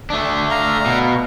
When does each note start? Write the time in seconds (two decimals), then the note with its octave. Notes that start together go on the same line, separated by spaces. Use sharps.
0.10 A3 D4
0.51 F5 A#5
0.86 B2